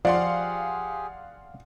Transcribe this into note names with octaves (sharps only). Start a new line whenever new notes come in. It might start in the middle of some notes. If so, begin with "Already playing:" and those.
F3 G4 G#4 D5 F5 F#5 C6